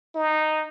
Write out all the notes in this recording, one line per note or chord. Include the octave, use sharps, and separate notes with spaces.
D#4